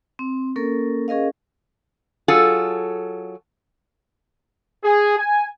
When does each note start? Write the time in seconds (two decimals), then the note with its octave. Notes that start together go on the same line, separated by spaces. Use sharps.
0.19 C4
0.56 A#3 C#4 A4 A#4
1.08 C#4 G#4 A#4 D#5 F5
2.28 F#3 F4 G#4 A4
4.84 G#4
5.18 G#5